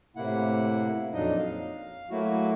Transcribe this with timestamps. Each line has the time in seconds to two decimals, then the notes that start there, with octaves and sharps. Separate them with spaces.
0.16 A2 C3 A#3 E4 F#5
1.13 F2 A#2 F#3 D4 D#4 D#5
1.38 F5
2.10 F#3 A3 A#3 E4 F#4